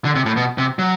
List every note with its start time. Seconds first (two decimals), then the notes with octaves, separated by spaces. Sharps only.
0.05 D3
0.16 C3
0.26 A2
0.37 B2
0.58 C3
0.79 F#3